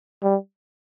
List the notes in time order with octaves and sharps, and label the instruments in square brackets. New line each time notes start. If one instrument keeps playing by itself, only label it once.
[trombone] G3